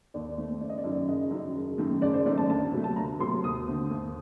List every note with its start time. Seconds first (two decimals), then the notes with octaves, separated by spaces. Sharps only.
0.14 D#2 D5
0.38 D#3 A3 C4
0.61 F#1 D5
0.69 D#5
0.78 D5
0.84 F#2 D#3 F#3
1.08 F#1 D#5
1.31 F#2 D#3 F#3
1.56 F#1
1.78 F#2 D#3 A3
2.02 F#1 D5
2.13 C5
2.26 F#2 D#3 A3 D5
2.38 A5
2.50 D2 A5
2.73 C3 F#3 A3
2.84 A5
2.96 D2 A#5
3.20 C3 F#3 A3 C6
3.44 D#2 D#6
3.67 D3 A3 C4
3.90 D#2 D#6